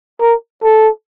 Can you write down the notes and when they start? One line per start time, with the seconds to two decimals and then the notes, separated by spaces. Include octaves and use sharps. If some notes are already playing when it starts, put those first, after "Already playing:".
0.21 A#4
0.63 A4